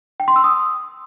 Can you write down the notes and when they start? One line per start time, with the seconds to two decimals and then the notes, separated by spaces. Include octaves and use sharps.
0.20 G5
0.28 C6
0.36 E6
0.44 D#6